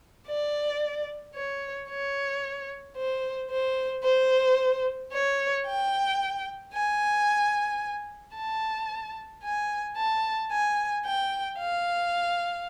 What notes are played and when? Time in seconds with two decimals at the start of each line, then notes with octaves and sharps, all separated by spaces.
0.28 D5
1.35 C#5
1.90 C#5
2.97 C5
3.51 C5
4.04 C5
5.13 C#5
5.67 G5
6.74 G#5
8.36 A5
9.43 G#5
9.97 A5
10.51 G#5
11.05 G5
11.59 F5